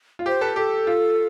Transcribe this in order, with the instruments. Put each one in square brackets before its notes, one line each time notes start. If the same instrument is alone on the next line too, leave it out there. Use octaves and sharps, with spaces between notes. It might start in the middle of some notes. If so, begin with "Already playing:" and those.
[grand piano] F4
[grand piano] G4 [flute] C5
[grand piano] A4 [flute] B4
[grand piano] G4 [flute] A4
[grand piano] F4